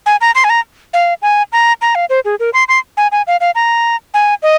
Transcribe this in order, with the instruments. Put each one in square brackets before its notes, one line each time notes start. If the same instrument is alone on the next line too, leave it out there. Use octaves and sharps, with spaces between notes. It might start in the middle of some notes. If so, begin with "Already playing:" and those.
[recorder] G#5
A#5
C6
G#5
A#5
F5
G#5
A#5
A#5
F5
C5
G#4
A#4
C6
C6
G#5
G#5
F5
F5
A#5
G#5
D#5